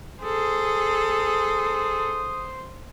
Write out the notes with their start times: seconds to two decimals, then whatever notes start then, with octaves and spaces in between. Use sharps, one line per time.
0.23 G#4 A4 C5 D#6